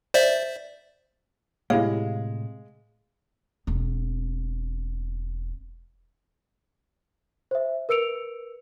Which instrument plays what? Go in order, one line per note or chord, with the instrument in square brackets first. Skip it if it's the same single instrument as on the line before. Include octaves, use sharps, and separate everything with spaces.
[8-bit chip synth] C5 D5 E5
[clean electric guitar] A2 C3 [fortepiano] G#3 [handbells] E4 G4 C#5 [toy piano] F5
[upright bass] E1 C4
[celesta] C5 E5
A#4 B4 E6 C#7 D7 F7